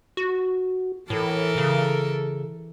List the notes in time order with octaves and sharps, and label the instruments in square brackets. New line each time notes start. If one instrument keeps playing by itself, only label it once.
[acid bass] F#4
[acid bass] A2 [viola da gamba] E3 A4 A#4
[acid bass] C#3